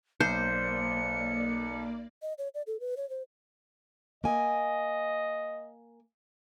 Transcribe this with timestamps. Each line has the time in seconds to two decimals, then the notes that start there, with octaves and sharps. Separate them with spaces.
0.20 B1 A#3 C5 D5 C#7
2.22 D#5
2.38 C#5
2.54 D5
2.67 A4
2.80 B4
2.97 C#5
3.10 C5
4.24 A#3 D#5 G#5